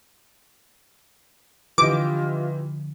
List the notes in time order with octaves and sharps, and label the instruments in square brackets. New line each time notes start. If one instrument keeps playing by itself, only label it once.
[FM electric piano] D3 F3 [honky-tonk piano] E3 G4 D#5 [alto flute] F4 [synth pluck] D6